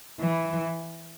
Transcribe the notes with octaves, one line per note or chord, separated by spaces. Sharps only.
E3